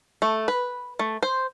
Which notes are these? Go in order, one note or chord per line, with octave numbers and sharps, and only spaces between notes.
A3
B4
A3
C5